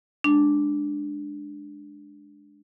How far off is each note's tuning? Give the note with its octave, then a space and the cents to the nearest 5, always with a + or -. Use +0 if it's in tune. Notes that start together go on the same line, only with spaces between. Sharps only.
G#3 +0 D4 +5